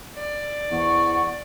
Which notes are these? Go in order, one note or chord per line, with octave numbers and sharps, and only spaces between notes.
D5
E2 C5 F#5 C#6